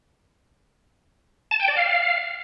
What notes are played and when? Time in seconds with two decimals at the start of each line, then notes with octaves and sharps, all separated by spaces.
1.51 A5
1.60 G5
1.68 D5
1.77 F5